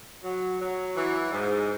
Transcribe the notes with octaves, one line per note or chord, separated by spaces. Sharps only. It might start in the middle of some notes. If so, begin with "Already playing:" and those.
F#3
F#3
E3
G#2